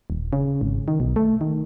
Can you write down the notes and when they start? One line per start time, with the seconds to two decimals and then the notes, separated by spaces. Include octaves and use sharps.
0.10 D#1
0.33 C#3
0.61 G#1
0.88 D#3
1.00 B1
1.16 A3
1.41 D#3